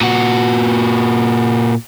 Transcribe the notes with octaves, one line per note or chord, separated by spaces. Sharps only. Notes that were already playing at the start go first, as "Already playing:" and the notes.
A#2 F#4